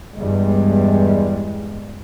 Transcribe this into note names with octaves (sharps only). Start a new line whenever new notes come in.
E2 G2 G3 G#3